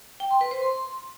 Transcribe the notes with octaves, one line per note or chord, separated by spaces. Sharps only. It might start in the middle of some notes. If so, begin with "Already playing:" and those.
G5
C6
B4
C5
C6